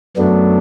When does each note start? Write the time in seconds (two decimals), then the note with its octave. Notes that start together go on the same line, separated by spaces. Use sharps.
0.17 F#2 F#3 A3 B3 D4